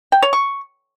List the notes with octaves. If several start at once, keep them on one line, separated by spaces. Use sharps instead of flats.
G5
C#5
C#6